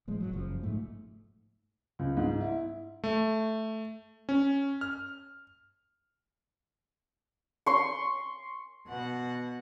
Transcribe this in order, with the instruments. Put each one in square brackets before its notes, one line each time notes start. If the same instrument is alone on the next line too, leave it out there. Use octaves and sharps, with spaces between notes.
[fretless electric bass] A1 F3 G#3
G#1 F#3
F#1 C#3 F3
B1 G#2 A3
[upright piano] C#2
G#2
E4
[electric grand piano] A3
C#4
F6
[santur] C6 C#6
[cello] B2 F#5